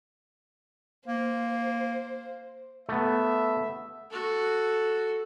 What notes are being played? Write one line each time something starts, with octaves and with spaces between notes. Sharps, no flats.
A#3 C5
A3 B3 E5
F#4 A4